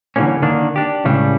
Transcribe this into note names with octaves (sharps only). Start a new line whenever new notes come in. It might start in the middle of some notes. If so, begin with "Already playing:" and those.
D3 E3 F#3 G3 A#3 C#4
D3 D#3 A#3 D4
D4 G4
C#2 A2 C#3 G3